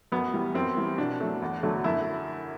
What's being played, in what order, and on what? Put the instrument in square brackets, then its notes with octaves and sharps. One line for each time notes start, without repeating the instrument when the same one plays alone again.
[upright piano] F#2 B3
E3 G3
F#2 C4
E3 G3
B2 D4
F#3 A3
E2
D3 F#3 A3
F#2 E4